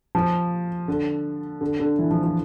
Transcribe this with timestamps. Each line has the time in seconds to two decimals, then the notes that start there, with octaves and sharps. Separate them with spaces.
0.15 F3
0.88 D3
1.61 D3
1.79 D3
1.99 E3
2.11 F3
2.23 F3